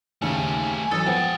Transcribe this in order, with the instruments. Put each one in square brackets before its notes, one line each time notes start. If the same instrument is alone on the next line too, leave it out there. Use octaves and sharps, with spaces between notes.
[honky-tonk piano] D#2 C#3 [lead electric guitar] A3 G4 [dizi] G#5
[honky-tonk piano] A1 F#3 [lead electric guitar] A4 [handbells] D#6 A6
[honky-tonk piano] F3 B3 [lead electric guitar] G#3 F#5 [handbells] G5